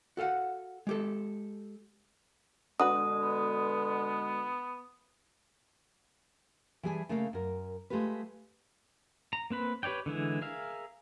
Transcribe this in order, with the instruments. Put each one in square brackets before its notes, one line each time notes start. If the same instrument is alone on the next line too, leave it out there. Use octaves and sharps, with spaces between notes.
[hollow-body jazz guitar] F#4 A4 F5 F#5
G#3 G4 A4
[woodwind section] B2 D3 G#3 [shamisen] D4 F#4 B4 [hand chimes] D#6
[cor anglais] B3
[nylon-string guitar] E3 G3 G#4 E5 G#5 A5
C#3 A3 A#3 A#4 F5
F#2 A#4
G#3 A3 F4 G4 B4
[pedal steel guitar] A#5
A#3 C4 B4 B5
G4 B4 C#5 D5 G5
D3 E3 G#3 E4
G#4 A#4 E5 F5